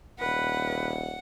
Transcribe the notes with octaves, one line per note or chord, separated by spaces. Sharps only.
D#1 B4 F#5